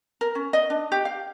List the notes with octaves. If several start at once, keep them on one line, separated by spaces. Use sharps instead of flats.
A#4
C#4
D#5
D4
G4
F5